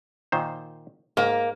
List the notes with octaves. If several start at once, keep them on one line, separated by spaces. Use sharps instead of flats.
A#2 D#3 C5
G#2 A#3